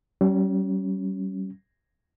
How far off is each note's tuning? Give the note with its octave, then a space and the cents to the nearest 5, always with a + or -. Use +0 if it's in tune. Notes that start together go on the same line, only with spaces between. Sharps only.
G3 -40 C#4 +0